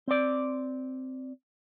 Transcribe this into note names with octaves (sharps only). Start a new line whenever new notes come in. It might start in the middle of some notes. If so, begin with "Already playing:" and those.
C4 D5